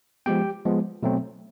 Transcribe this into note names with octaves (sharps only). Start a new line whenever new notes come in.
F3 G#3 B3 G4 G5
F3 G#3 B3
B2 F#3 A3 C4